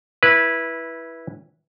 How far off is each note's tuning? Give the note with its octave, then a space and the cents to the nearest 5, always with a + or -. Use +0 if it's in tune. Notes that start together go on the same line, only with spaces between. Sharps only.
E4 +0 B4 -15